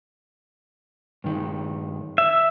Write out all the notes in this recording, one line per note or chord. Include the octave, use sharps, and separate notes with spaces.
G2 D#3
E5